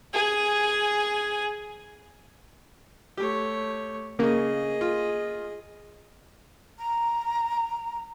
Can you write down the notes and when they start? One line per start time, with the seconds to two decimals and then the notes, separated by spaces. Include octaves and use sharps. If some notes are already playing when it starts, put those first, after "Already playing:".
0.14 G#4 G#5
3.17 A3 G4 C#5
4.19 C#3 A#3 G#4 D#5
4.81 F4
6.78 A#5